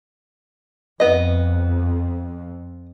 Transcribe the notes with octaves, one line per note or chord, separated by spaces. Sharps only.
F2 B3 D#5